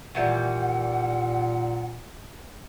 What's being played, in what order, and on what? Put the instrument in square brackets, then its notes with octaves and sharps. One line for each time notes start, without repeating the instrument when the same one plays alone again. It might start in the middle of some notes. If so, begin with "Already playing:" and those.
[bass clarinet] A#2 [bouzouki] D#3 E3 G3 [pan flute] F#5